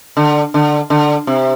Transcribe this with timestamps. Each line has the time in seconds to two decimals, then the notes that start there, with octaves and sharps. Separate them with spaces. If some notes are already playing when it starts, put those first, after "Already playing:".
0.17 D3
0.54 D3
0.90 D3
1.27 C3